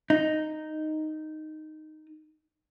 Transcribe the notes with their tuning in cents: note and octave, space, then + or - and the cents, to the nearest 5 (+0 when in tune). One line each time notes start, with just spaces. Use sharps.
D#4 -5